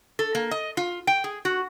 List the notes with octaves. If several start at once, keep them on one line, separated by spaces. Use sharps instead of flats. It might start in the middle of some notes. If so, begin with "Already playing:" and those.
A4
A#3
D#5
F4
G5
G#4
F#4